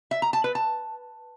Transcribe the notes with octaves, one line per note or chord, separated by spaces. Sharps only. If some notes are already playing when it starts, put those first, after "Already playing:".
E5
A#5
A5
B4
A5